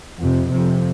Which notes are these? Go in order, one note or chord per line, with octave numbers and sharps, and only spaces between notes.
F2 C3
F2 C3